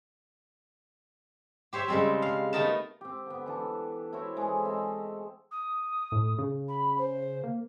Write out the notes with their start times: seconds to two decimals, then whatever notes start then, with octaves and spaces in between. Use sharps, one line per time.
1.73 G4 C5 C#5 E5
1.88 C#3 G3 G#3 C4 A4
2.22 F5
2.53 A3 B3 D#4 A#4 A5
3.01 C4 G4
3.26 D3 B3
3.46 E3 D4 A4
4.13 E4 F#4 C5 C#5
4.36 E3 G#3 G#4 A4
4.65 C4 D#5 E5
5.51 D#6
6.12 A2
6.38 C#3
6.68 B5
6.98 C5
7.43 A#3